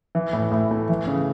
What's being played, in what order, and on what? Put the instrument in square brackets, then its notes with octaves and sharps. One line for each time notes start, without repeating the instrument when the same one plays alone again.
[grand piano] E3
A2
A2
A3
E3
C#3